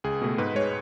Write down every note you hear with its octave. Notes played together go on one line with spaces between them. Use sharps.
C#2 G#4
B2 A3
G#2 B4
G#3 C#5